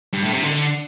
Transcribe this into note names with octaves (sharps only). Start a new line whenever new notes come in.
G2
A2
C3
D3